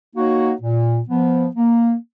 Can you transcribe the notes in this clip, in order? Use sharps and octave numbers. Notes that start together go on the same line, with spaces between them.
A#3 D#4 F#4 C#5
A#2
F3 B3
A#3